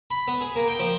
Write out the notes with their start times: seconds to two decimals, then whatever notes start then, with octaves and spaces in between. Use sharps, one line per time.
0.11 B5
0.28 B3
0.41 G#4
0.56 A#3
0.68 G5
0.79 F3